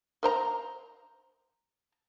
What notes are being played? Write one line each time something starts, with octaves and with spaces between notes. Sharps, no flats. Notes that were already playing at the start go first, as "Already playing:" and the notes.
A#4 C5 A#5